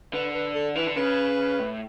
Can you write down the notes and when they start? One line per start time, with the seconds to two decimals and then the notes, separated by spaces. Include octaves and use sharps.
0.13 D3 B4
0.34 B4
0.55 A4
0.75 E3 B4
0.87 D3
0.96 C#3 B4
1.60 A2